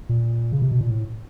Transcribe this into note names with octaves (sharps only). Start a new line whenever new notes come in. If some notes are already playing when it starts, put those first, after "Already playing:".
A#2
C#3
C3
B2
A#2
A2